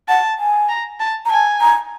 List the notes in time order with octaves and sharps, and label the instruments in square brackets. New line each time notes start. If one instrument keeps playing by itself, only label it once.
[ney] F#5 [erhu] A5
[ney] G#5
[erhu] A#5
A5
[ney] A#5
[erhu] G#5 [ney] A5
[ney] A#5